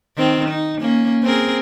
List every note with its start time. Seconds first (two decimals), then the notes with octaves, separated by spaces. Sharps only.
0.17 D#3 C4
0.49 D#4
0.81 A#3 C#4
1.23 C4 G#4 A#4